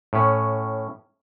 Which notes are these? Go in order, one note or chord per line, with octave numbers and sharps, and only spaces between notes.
A2 C#4